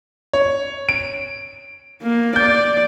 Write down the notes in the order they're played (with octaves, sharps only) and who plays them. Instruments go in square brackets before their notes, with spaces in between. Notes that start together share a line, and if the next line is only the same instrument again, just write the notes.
[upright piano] C#5
D7
[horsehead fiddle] A#3
[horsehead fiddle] D5 [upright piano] G6